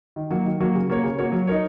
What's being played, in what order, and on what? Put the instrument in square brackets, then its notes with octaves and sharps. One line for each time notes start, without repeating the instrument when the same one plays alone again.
[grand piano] D#3
F#3 A#3 F#4
D#3
F#3 A#3 F#4
C#3
A#3 F#4 A#4 C#5
C#3
A#3 F#4 A#4 C#5
F#3
D#4 A#4 C#5